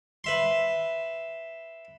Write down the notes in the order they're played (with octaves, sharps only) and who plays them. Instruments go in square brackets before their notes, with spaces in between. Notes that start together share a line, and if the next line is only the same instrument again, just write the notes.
[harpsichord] B4 E5 C6